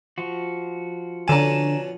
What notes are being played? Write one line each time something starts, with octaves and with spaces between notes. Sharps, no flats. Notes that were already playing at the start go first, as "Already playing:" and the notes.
F3 F#4
B2 D3 C#4 D4 G#5 A#5 E7